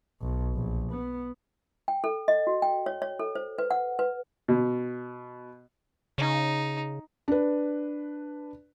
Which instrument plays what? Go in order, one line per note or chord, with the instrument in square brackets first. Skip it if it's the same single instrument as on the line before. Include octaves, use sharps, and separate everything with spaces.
[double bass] B1
A#1
B3
[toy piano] G5
A4
D#5
F#4
G5
C#5
C#5
A4
C5
B4
F#5
B4
[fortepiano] B2
[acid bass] C#3 [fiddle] D#4
[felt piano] D4 B4